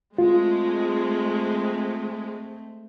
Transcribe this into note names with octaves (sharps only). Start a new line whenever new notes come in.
G#3 A3 C4 F4